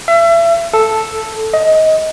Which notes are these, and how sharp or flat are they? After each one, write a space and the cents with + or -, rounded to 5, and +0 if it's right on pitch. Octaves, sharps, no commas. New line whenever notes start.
E5 +35
A4 +0
D#5 +20